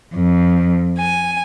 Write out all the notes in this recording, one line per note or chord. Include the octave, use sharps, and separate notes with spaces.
F2
G#5